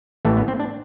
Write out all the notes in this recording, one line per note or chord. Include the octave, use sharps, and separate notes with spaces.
A1 A2 E3 A3
B3
C4
D4